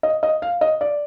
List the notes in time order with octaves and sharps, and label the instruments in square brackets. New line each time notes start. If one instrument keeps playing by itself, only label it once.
[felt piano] D#5
D#5
F5
D#5
D5